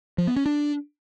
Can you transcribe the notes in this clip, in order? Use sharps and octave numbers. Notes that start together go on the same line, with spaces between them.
F3
B3
C#4
D4